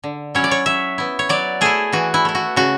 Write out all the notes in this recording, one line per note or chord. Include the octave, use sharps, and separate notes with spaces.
D3
F#3 C#4 E4 C#5
D5
C#5
F#3 E5
B3 E4
C#5
F#3 D5
A3 E4 G#4
E3 F#4
E4
A3 E4
F#4
C#3 F#4